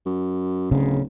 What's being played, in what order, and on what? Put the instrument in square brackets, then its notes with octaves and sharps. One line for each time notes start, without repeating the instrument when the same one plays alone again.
[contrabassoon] F#2
[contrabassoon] D1 [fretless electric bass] C#3